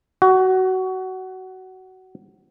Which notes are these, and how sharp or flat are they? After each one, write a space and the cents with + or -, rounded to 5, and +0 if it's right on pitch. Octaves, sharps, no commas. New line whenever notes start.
F#4 +20